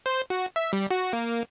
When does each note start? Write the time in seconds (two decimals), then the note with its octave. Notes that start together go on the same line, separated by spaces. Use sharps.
0.06 C5
0.30 F#4
0.56 E5
0.73 G3
0.91 F#4
1.13 A#3